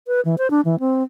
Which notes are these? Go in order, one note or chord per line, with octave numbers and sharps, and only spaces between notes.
B4
E3
C5
D4
E3
C4